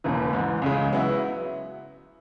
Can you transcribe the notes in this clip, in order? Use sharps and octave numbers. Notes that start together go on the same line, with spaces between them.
E1 D#2 C#3 E3
G#2 E3 B3
C#2 C#3 G#3
F#3 B3 E4